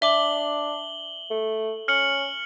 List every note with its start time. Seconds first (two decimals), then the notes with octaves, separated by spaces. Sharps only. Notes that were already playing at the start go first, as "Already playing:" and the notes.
0.02 D4 E5 D6 F#7 G7
1.30 A3
1.88 C#4 F6 C#7 F#7